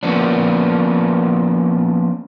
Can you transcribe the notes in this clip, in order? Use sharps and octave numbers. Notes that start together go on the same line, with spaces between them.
F3 A#3 B3 C#4 D4